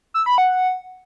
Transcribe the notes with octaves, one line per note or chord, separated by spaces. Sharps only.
E6
B5
F#5